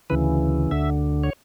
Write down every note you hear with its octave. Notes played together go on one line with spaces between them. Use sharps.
D2 C#3 E3 B4
D2 D3 E5
C#5